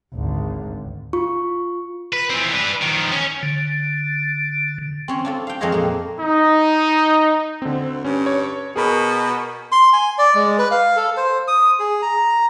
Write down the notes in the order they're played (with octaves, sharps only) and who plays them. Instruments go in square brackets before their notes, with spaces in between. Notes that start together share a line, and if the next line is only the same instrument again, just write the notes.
[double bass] G#1 D2
[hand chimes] F4 C#6
[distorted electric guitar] B4
E3 C4
D4 B4
D#3 F3
C#4
[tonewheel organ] D3
[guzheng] C4 C#4 C#5
D4 F4 A4
F5 G5
F2 G#3 C4 C#5 D#5 F5
A#2 A#3
[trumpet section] D#4
[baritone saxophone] D2 [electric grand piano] D3 C4
[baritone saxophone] G2 [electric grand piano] C#4
[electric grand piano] C#5
[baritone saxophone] B2 [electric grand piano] G#4 A#4 B5
[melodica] C6
G#5
D5
G#3
B4
F5
A4
C5
D#6
G#4
A#5